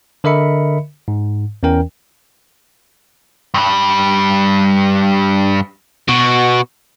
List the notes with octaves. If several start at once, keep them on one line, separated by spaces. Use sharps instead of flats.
D3 A#4 D#5 E5 B5 C#7
G#2
E2 E3 C#4 A#4 G5
G2 G3
B2 F#4